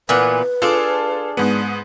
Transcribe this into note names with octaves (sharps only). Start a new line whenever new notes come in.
A#2 E3 B3 B4
D4 F4 G#4 A4
G#2 B3